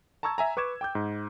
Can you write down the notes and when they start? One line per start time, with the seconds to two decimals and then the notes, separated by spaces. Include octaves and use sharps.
0.23 A5 A#5 C#6 E6 G#6
0.38 E5 G#5 A#5
0.57 B4 C#6 D6 G#6 E7
0.81 G5 D6 G6
0.95 G#2